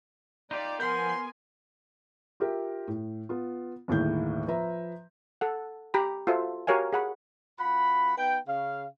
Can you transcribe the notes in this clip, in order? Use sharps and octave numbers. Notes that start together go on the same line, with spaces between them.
D#4 F4 G4 D5
F3 B3 A#4 F#5 G#5 C6 G6
F4 G4 A#4 E5 G5
A2
B3 F4
G1 D#2 A2 E4 G#4 G6
F3 B4 E5 A#5
A4 F#5
G4 A#5 B5
F4 F#4 A4 C5 E5
F#4 G4 A#4 C#5 F5 G#5
G#4 F#5 B5
F#2 F4 F#5 B5
B3 D#4 B4 G5
C#3 F5